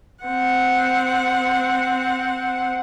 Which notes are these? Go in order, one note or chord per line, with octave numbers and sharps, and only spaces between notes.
C4 F#5